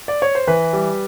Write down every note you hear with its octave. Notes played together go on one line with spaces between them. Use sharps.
D5
C#5
C5
E3 B4
G3